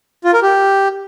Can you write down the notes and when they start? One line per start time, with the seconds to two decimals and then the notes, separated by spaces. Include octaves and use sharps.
0.24 F4
0.33 A#4
0.42 G4